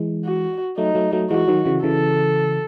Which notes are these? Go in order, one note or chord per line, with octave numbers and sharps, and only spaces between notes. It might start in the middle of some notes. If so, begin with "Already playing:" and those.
Already playing: E3 G#3
F#4
F#3 A3 D#4
F#3 A3
F#3 A3
E3 G#3 F#4
D#3 F#3
C#3 E3
C#3 E3 A4